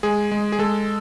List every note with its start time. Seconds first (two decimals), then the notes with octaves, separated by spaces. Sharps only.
0.03 G#3 G#4
0.32 G#3
0.52 G#4
0.59 G#3 A4